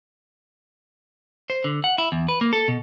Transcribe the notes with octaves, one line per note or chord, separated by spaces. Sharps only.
C5
D3
F#5
E4
E2
B4
A#3
A4
B2